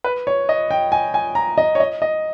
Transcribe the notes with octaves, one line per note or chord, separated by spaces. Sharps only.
B4
C#5
D#5
G5
G#5
G#5
A#5
D#5
C#5
D#5
D#5